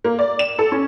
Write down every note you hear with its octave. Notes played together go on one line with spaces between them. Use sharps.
A#3
D5
E7
A4
C#4